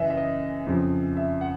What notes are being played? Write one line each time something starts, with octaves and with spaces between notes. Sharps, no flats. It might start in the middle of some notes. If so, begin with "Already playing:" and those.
Already playing: F#2 C#3 E3 D#5 E5
E5
D#5
F2 C#3 F3
E5
F#5